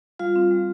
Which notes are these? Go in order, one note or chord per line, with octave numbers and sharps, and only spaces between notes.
G3 F4 F5
C4
G3